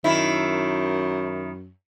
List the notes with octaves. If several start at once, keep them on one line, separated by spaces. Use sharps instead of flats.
F#2 D#3 E4